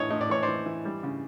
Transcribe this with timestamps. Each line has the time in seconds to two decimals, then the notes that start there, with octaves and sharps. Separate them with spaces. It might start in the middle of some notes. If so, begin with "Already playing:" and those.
Already playing: A2 E3 C#5 D#5
0.10 A2 D#5
0.21 D5
0.29 E3 C#5
0.43 C5 D5
0.48 E3
0.66 E3
0.85 G3
1.03 C#3